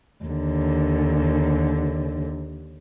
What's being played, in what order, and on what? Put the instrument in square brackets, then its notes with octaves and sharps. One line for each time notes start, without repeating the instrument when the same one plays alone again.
[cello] D#2 D3